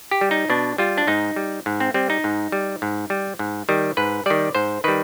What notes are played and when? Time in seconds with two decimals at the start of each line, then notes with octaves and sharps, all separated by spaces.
0.11 G4
0.21 G3
0.31 D#4
0.50 B2 D4
0.78 G3 F4
0.98 D4
1.07 G#2 D#4
1.36 G3
1.66 G#2
1.80 C4
1.94 G3 C4
2.10 D#4
2.24 G#2
2.52 G3
2.82 G#2
3.10 G3
3.39 G#2
3.69 D#3 G3
3.97 G#2 B4
4.26 D#3 G3 D5
4.55 G#2 C5
4.84 D#3 G3 B4